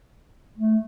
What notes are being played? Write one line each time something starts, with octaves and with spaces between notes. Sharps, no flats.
A3